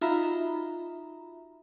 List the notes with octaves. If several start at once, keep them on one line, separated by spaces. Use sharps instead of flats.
D#4 F4 F#4 E5 A#5 B5